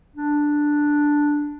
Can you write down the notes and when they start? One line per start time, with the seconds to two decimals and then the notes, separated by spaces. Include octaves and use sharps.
0.16 D4